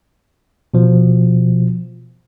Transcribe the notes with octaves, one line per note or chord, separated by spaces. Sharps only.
B2 F3